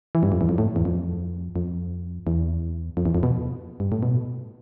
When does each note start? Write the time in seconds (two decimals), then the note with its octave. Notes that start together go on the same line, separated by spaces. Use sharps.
0.15 E3
0.23 G2
0.32 F2
0.41 E2
0.49 F2
0.58 A2
0.76 E2
0.85 F2
1.56 F2
2.27 E2
2.97 F2
3.05 E2
3.15 F2
3.23 B2
3.80 G2
3.92 A2
4.03 B2